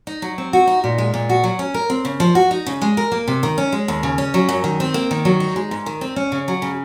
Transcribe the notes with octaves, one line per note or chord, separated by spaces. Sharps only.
D#4
F#3
C4
F#4
D#4
A#2
G#3
A#2
F#4
F#3
C#4
A#4
C4
C#3
F3
F#4
D#4
C#3
G#3
A#4
A#3
C3
D#3
C#4
G#3
D#2
C#3
C#4
F#3
F#2
D#3
C4
A#3
D#3
F#3
D#4
G#3
G#2
D#3
C4
C#4
C#3
F#3
C#3